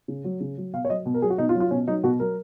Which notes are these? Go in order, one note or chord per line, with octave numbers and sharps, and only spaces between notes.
C#3
F#3
C#3
F#3
B2 F5
C#5
F#3 D#5
B2
A#4
F#3 G#4
F#4
B2 D#4
F4
F#3
F4
B2 C#4
F#3 D#4
B2 F#4
F#3 A#4